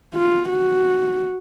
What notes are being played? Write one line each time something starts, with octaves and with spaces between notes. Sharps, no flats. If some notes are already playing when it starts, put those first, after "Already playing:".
F4
F#4